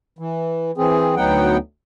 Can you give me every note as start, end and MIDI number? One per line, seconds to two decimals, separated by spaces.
0.19 0.71 52
0.78 1.15 52
0.78 1.15 60
0.78 1.15 68
1.16 1.57 38
1.16 1.57 54
1.16 1.57 59
1.16 1.57 63
1.16 1.57 78
1.16 1.57 79